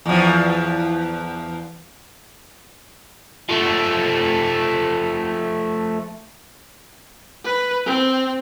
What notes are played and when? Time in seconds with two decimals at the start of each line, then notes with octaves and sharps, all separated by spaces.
0.06 E2 F3
3.49 F3 A3
7.44 B4
7.87 C4